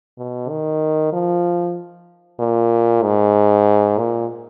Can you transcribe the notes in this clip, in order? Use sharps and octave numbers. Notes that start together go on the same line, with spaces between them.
B2
D#3
F3
A#2
G#2
A#2